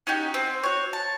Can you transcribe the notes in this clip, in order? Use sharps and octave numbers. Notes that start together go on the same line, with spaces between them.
C#4 D#4 F#4 G4
C4
F#4 C#5
A5